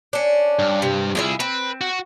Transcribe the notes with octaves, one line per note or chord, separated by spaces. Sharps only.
C#4 D4
G2
C3
C2 E4 F4 G#4 E5
C4 B4
F#4